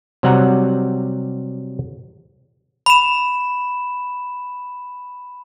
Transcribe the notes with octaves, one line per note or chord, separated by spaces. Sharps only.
C3 F#3 G3 F#5 G#5 A#5
B5 E7